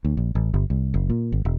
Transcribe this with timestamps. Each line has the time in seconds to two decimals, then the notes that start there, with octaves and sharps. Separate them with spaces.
0.04 D2
0.17 A#1
0.35 A1
0.54 G1
0.70 C2
0.94 F#1
1.10 A#2
1.32 G#1
1.45 E1